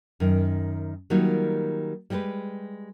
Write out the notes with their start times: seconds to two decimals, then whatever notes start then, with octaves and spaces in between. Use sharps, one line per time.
0.20 F#2 D#3
1.10 D#3 F#3 G3 A#3 D#4 F4
2.10 G3 G#3 G4 A#4 B4